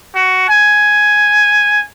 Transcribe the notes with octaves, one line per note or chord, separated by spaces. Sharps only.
F#4
G#5